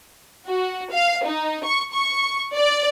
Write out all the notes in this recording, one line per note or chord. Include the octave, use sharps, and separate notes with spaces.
F#4
F5
D#4
C#6
C#6
D5